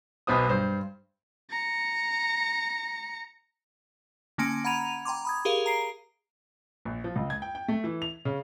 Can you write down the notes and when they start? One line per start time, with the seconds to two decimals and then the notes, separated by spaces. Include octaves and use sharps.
0.27 B1 B2 B3 C5 D#6
0.49 G2 C5
1.50 A#5 C#7
4.38 D3 A#3 C#4 G#5 C6 D7
4.64 F#5 A#5 B5 G#6 D#7 F7
5.05 G5 A#5 C6 D6
5.25 B5 D#6 G#6
5.45 G4 G#4 A#4 F5
5.66 A#5 C7 D7
6.85 A#1
7.04 F3
7.16 C#2
7.30 G#6
7.42 G5
7.55 G5
7.68 A3
7.84 E3
8.02 F7
8.25 C#3